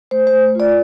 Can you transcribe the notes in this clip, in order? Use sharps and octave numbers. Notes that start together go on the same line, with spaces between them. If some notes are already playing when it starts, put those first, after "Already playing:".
A3 C5
C5
A3
F4 D5